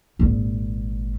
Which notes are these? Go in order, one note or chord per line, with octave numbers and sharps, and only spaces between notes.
G#1 A#2